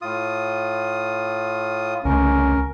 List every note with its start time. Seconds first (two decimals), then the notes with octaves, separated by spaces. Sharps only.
0.02 A2 F4 D#6
2.05 C2 C#3 A3 C#4 A#4